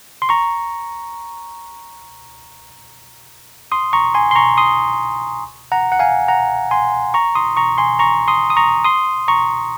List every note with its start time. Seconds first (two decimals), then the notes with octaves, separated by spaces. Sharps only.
0.22 C6
0.29 A#5 C#6
3.72 C6 D#6
3.93 A#5 C#6
4.15 G#5 C6
4.31 C6
4.35 A#5 C#6
4.58 C6 D#6
5.72 F#5 A#5
5.92 F#5
5.99 F5 G#5
6.28 F#5 A#5
6.71 G#5 C6
7.14 A#5 C#6
7.35 C6 D#6
7.57 A#5 C#6
7.78 G#5 C6
7.99 A#5 C#6
8.28 C6 D#6
8.50 D#6
8.57 A#5 C#6
8.85 C6 D#6
9.28 A#5 C#6